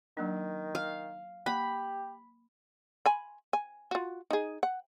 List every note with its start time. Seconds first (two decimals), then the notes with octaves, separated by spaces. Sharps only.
0.17 D#3 F#3 A#3 D4
0.75 F5
1.46 A#3 G4 B5
3.06 G#5 B5
3.53 G#5
3.91 F4 F#4
4.31 D#4 G#4
4.63 F#5